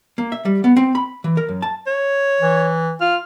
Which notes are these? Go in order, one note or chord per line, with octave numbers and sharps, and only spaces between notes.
A#3
E5
G3
B3
C4
B5
E3
A#4
F#2
A5
C#5
E3
F4 F6